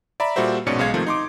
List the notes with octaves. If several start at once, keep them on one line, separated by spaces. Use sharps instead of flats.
D5 E5 A#5 B5
A#2 G3 F#4 A4 C5 E5
A#1 G#2 B2 C#4 D5 C#7
B1 G#3 F5 G#6
C3 D#3 F3 A3 C4
D#4 C6 D6